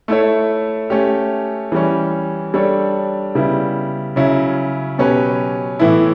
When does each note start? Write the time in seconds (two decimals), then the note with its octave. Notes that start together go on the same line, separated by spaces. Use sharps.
0.08 A3 E4 A4 C#5
0.90 A3 C#4 G4
1.72 E3 G3 C#4
2.54 G3 D4 A4 C#5
3.35 C#3 G3 B3 E4
4.16 C#3 F#3 C#4 E4
4.98 B2 F#3 C#4 G4 B4
5.79 A2 E3 B3 E4